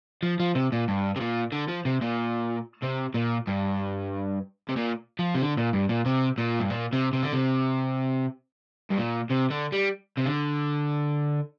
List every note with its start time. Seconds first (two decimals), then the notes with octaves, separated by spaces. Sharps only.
0.23 F3
0.40 F3
0.55 C3
0.72 A#2
0.88 G2
1.16 C3
1.20 A#2
1.52 D3
1.68 F3
1.85 C3
2.02 A#2
2.82 C3
3.14 A#2
3.47 G2
4.69 C3
4.77 A#2
5.19 F3
5.35 C3
5.42 D3
5.57 A#2
5.73 G2
5.89 A#2
6.06 C3
6.38 A#2
6.59 G2
6.70 A#2
6.93 C3
7.13 C3
7.23 D3
7.33 C3
8.90 G2
8.97 A#2
9.30 C3
9.50 D3
9.72 G3
10.18 C3
10.26 D3